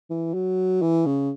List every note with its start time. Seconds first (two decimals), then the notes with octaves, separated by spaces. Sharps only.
0.10 E3
0.34 F#3
0.82 E3
1.06 C#3